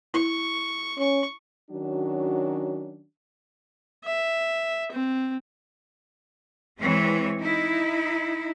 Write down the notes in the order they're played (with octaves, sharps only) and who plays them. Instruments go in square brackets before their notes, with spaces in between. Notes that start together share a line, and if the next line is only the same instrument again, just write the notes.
[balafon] E4 [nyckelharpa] C#6
[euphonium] C#4 [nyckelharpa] C#6
[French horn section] D#3 F#3 C#4 D4 F#4
[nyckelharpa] E5
C4
[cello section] E3 G#3 C4 C#5
D#4 E4